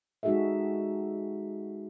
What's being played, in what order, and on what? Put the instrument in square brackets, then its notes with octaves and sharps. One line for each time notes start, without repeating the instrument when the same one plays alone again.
[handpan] G#3 D#4 F#4 G#4 A4 E5